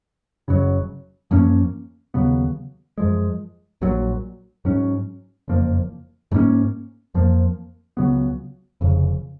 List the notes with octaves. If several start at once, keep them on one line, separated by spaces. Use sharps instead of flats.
F#1 F#2 C#3 F#3
F#2 F3 A#3 C#4
D#2 C#3 F#3 B3
F#2 F3 G#3
A#1 A#2 F#3
G#2 F#3 C#4
F#1 F2 F3 A#3
G#2 F#3 A#3 C#4
F2 F3 A#3
C#2 C#3 F#3 B3
F1 F2 C#3